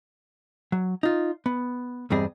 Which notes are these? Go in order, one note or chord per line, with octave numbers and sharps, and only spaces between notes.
F#3
D#4 F4
B3
E2 G2 G3 C4 G#4 D#5